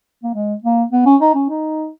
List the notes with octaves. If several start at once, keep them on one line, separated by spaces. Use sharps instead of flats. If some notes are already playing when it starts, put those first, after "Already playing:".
A#3
G#3
A#3
B3
C#4
D#4
C#4
D#4